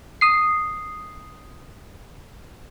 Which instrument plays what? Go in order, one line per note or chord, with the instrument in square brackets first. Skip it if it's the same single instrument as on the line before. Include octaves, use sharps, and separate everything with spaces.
[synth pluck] D#6 C7